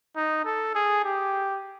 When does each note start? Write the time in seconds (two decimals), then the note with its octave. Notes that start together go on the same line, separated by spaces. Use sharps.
0.16 D#4
0.45 A4
0.75 G#4
1.04 G4